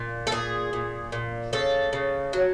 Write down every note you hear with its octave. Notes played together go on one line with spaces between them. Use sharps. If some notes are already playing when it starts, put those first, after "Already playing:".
Already playing: A#2
A4
A#2 G#4
A#2
A#2
C#3 A4
C#3
F#3